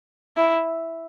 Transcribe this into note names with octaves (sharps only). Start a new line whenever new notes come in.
E4